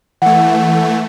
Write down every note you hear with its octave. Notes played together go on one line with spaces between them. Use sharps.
E3 A3 F#5